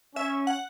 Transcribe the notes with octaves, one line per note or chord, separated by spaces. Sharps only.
C#4 E5
F#5